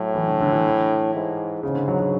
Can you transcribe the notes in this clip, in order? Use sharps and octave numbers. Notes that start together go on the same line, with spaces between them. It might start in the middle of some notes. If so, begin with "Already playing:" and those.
Already playing: A2 F#3
E3
D3
D3
E3
G#2
G#2 C#3
D3
F#3
F#3